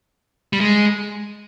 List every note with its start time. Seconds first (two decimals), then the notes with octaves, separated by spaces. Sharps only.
0.53 G3
0.61 G#3